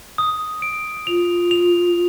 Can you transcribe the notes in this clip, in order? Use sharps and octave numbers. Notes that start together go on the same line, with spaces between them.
D#6
D7
F4 F7
F7